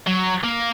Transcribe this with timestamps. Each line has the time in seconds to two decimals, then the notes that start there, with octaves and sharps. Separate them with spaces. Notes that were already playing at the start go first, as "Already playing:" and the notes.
0.07 F#3
0.44 A#3